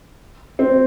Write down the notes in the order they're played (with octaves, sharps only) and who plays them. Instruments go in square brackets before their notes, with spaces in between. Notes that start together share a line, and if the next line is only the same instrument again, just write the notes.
[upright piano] C4